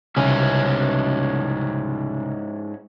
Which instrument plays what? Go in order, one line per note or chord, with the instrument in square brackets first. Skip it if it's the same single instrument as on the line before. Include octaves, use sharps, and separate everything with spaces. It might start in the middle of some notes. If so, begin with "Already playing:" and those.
[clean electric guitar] C2 C#3 G#5 [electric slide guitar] G#2 C#4 E4